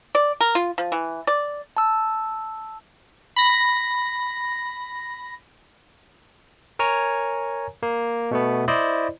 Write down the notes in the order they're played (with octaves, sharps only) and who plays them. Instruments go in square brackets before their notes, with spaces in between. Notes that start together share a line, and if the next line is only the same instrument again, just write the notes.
[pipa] D5
A#4
F4
F3
E3
D5
[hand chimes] A5 E6
[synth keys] B5 A#6
[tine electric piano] A#4 C#5 G#5 A#5
A#3
B2 A3 B3
E4 C5 D5 D#5